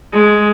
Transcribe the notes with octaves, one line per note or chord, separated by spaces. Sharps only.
G#3